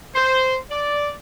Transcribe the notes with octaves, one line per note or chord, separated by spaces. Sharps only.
C5
D5